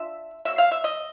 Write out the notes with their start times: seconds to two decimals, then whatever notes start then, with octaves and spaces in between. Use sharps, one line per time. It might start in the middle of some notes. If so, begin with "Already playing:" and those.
Already playing: D4 F4 E5
0.45 F#3 A#3 E5
0.58 F5
0.72 E5
0.84 D#5